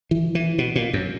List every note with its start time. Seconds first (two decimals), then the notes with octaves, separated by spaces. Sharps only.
0.11 E3
0.35 E3
0.58 B2
0.76 A#2
0.93 F#2